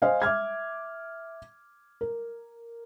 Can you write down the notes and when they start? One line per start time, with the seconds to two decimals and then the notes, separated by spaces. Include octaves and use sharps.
0.02 C5 D#5 F5 G#5
0.22 E5 D6 F6 G#6
2.01 A#4